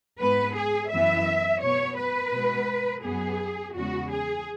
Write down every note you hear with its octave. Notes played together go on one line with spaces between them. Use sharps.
G#2 G#3 B3 B4
G#4
F#2 E3 B3 E5
B2 B3 C#5
B4
B2 G#3 B3
F#2 F#3 B3 G#4
E2 C#3 G#3 B3 F#4
G#4